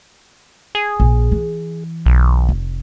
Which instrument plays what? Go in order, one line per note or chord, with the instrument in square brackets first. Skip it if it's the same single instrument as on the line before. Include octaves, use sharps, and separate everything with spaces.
[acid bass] G#4
[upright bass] A#1
E3
[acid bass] B1
[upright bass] F1